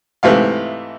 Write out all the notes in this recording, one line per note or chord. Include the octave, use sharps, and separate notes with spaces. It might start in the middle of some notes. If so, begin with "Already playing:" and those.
G#2 C3 E3 A3 F5